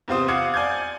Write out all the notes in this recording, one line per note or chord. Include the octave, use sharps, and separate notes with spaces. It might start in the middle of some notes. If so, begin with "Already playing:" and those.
E2 C3 C4 F4 C5 D#6
F5 F#5 D6 D#6 G#6 C#7
D5 G#5 D6 G6 G#6